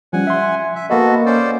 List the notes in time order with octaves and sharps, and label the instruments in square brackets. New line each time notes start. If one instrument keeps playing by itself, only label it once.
[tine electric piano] F3 G3 C#4 [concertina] F#5 G#5
[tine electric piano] E5 C6
[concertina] E5
[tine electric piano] A#3 D#5 [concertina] B3 F#4 A4
[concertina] C#4 C5 D5